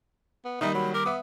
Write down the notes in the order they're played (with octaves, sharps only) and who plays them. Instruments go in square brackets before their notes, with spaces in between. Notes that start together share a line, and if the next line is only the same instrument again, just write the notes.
[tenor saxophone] B3
[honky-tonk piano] D#3 G3 A#3 [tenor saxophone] D#4 [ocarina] E5
[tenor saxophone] F#3 [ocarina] B5
[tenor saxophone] A#4 [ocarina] D6
[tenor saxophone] B3 [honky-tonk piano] E5 D#6